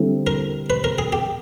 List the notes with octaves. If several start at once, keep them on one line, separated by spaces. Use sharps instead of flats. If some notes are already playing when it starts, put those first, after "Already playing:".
Already playing: D3 G3 C4 E4 A4
A#4
B4
A#4
G#4
G4